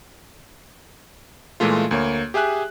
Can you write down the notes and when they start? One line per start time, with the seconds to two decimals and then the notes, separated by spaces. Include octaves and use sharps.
1.60 A#2 E3 G#3 A3 F4
1.91 D2 A#3 C#5
2.34 G4 G#4 E5 G#5 F#6